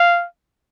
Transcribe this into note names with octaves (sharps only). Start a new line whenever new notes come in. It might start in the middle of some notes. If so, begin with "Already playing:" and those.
Already playing: F5